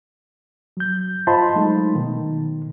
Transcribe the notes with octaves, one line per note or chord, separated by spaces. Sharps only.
F#3 G6
F4 C5 D#5 A5 B5 C6
F#3 G#3 A3 D#4
B2 D#3